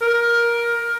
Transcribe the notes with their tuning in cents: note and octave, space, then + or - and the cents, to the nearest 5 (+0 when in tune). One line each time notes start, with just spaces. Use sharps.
A#4 +15